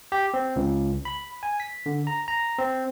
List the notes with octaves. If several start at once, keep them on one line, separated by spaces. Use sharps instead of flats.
G4
C4
C#2
B5
G#5
B6
D3
A#5
A#5
C4